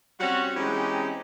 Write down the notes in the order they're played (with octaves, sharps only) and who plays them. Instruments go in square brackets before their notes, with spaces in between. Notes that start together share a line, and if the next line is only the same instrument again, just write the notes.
[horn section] G3 C4 C#4 F#4
E3 G#3 C4 C#4 D#4 G4